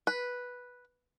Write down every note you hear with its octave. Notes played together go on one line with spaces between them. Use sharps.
B4